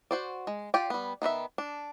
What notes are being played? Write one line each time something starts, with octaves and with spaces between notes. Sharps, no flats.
F#4 C5 D5
G#3
F4 G4 D5 G5
G3 B3
D#3 B3 F#4 E5
D4